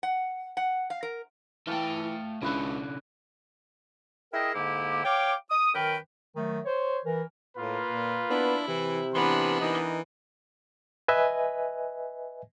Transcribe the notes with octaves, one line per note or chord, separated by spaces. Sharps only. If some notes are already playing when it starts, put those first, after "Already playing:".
F#5
F#5
F5
A#4
E3 A3 F5 G5 A5
C#2 C#3 D4 E4 B4
E4 G#4 A#4 D#5 E5 G5
G#2 D3 A#3 E4 G4 D6
C#5 F5 G5 D6
D#6
F#2 D#3 A#4 B4 G5
D#3 F#3 A3
C5 C#5
E3 A#4
A2 A#3 F4 B4
A#2
B3 D4 E4
C3 E3
E3 B3 D4 A#4 B5 C6
E3 D#4 A#4 D#5
B4 D#5 E5 G#5